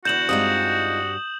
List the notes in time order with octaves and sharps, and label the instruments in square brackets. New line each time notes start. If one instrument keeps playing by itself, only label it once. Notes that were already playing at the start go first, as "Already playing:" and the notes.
[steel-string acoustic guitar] E2 D3 [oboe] F#4 [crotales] G6 E7 F#7
[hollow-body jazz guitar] G2 G3 C4 [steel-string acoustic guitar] G#3 D#4 F4 [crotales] D#6